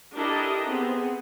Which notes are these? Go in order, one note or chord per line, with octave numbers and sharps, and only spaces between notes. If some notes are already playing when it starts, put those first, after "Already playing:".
D4 E4 G4 A4 A#4 D#5
B3 C4 G#4